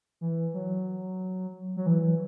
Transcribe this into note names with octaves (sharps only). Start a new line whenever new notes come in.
E3
F#3
F#3
E3
E3